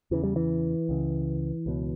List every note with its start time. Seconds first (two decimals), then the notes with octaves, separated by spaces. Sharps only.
0.11 E2 C#3 E3
0.24 G3
0.36 E3
0.89 C#2 C#3
1.66 C#2 B2